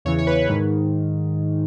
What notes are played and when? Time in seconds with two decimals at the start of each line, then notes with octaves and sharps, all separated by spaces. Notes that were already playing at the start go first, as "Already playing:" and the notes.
0.05 E2 C#3 E3 C#5
0.19 C#5
0.27 B4
0.49 G#2 D#3 B4